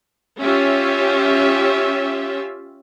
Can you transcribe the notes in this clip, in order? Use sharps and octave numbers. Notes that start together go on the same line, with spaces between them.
C#4 F4 G4 E5